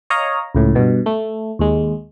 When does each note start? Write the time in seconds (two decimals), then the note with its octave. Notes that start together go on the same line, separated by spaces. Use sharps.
0.10 C#5 D#5 F5 A#5
0.55 C#2 A2
0.75 G2 B2
1.06 A3
1.59 D#2 G#3